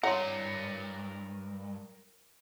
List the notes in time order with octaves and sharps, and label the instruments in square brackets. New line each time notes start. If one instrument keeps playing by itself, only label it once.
[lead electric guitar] G2 [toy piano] E4 C#5 C6 [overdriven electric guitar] A#4 G#5 [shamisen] F#5